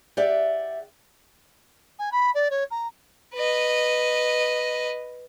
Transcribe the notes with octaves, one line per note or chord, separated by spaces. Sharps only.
G4 D5 E5 F#5
G#5
B5
D5
C#5
A#5
B4 D#5